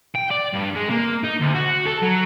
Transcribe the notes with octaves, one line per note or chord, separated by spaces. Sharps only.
G5
D5
G2
G#3
A#3
D#4
D2
F#4
A4
F#3